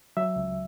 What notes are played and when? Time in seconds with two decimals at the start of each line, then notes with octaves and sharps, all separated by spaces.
0.17 F#3 E5
0.36 C#2